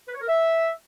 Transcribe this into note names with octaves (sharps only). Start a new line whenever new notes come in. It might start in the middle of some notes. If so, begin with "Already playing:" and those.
B4
C#5
A#4
E5